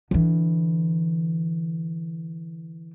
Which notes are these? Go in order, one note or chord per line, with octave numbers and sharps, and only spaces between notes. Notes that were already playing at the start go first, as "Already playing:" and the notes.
D3 E3